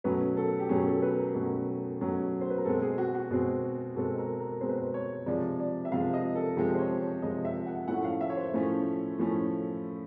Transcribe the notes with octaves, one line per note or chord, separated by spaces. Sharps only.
B2 F#3 A3 C#4 B4
A4
G4
B2 F#3 A3 C#4 G#4
A4
B4
A#4
B2 F#3 A3 C#4
B2 F#3 A3 C#4
C5
B4
A#4
B2 G#3 C4 A4
G#4
F#4
F#4
B2 G#3 C4
B2 G#3 C4 A4
A#4
A#4
B2 G#3 C4 C5
B4
C5
C#5
C3 F3 G#3 D5
D5
E5
C3 F3 G#3 F5
D#5
A4
C3 F3 G#3 G4
C5
C#5
C#5
C3 F3 G#3 D#5
E5
F#5
A2 F3 A3 C#4 F#5
F5
E5
C#5
C5
A2 F3 A3 C#4
A2 F3 A3 C#4